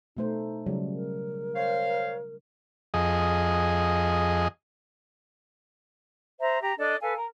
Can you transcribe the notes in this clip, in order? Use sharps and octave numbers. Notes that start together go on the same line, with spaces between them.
B2 A3 D#4 C5
C#3 F#3 G3
A#4
C5 C#5 F5
F2 G#4 D#5
C5 E5 A#5
G4 A#5
D4 A4 D5 D#5
A4 B4 F5 G#5
A#4